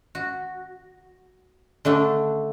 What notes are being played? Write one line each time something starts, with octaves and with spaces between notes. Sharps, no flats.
F#4
D3 A3 D4